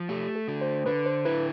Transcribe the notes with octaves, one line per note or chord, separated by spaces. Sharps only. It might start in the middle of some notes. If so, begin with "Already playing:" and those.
Already playing: F3
A3 G4
A4
D3
C5
D3 B4
C5
E4 B4